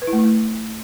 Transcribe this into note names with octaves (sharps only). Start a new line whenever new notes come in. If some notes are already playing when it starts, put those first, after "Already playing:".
B4
E4
A3
E4
A3